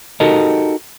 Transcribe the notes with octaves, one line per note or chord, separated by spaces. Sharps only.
D#4 F#4 G4 A4 A#4 D#5